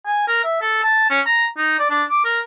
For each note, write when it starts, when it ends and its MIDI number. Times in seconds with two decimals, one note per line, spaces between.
0.06 0.26 80
0.28 0.41 70
0.44 0.60 76
0.61 0.82 69
0.83 1.08 81
1.10 1.20 61
1.26 1.45 82
1.58 1.77 63
1.79 1.89 74
1.90 2.03 62
2.10 2.21 86
2.25 2.40 70